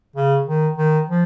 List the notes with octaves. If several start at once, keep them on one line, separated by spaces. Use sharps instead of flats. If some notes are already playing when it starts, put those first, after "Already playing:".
C#3
D#3
D#3
F3